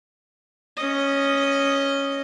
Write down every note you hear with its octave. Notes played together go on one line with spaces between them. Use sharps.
C#4 D#5